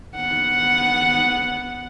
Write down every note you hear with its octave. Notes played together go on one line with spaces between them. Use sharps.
B3 F#5